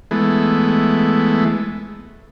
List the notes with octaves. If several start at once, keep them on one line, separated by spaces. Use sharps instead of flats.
E3 G#3 A3 B3